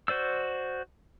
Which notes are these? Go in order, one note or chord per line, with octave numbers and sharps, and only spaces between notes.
F#4 C5 D5 E6